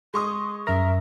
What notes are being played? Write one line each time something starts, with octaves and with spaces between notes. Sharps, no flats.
G#3 C6 C#6 D#6
F#2 A#4 E5 A#6